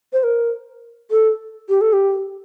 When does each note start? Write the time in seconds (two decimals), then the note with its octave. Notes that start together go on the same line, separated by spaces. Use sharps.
0.13 C5
0.23 A#4
1.11 A4
1.69 G4
1.81 A4
1.93 G4